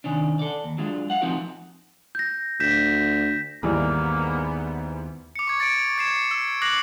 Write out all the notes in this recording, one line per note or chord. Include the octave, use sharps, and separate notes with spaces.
C3 D#3 C#4 D4
A4 D5
D#2
F#3 G#3 D4 F4
F5 F#5
F3 C4 D#4 F4 F#4 A#4
G6 A#6
D2 G6 B6 E7
D#2 G#2 E3 G3 A#3 B3
D6 C#7
C#6 G#6
A6 C#7 D7
G#6 C7 E7
E6
D6 F#6 A#6 C7 F#7